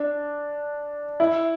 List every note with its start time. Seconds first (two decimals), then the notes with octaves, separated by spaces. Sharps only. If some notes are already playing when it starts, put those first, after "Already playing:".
Already playing: D4
1.20 E4